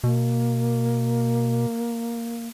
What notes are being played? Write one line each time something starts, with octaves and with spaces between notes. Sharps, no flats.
B2 A#3